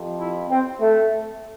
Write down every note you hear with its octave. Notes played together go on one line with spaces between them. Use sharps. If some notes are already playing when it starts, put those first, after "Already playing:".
Already playing: F2 C3 F3
E4
C4
A3